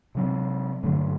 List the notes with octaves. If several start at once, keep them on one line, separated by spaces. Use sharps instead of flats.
C3 F#3 C4
G2 D3 F#3 A3